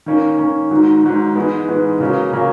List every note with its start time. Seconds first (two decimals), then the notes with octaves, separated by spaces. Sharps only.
0.06 D#3 A#3 C#4
0.38 D#3 A#3 C#4
0.71 G#2 D#3 F#3
1.04 G#2 D#3 F#3
1.35 G#2 E3 G#3 B3
1.69 G#2 E3 G#3 B3
2.00 C#3 F#3 A#3 C#4
2.33 C#3 F#3 A#3 C#4